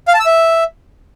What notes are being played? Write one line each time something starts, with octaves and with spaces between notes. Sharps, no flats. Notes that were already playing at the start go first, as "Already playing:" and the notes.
F5
A5
E6
E5